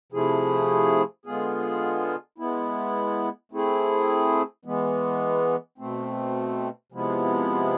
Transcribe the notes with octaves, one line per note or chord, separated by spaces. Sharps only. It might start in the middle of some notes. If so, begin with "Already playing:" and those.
C3 F3 A3 E4 G#4
D3 G#3 B3 F4 G#4
G#3 B3 E4
A3 C4 E4 G#4
E3 G#3 B3
B2 A3 C4
C3 F3 G#3 B3 E4